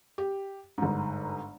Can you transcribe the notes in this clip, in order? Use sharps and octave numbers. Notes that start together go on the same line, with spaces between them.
G4
G1 G#2